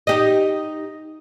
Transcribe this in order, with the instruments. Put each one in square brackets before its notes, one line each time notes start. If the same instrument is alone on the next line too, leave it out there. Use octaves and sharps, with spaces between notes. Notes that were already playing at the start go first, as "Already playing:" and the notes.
[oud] D#4 G4 D#5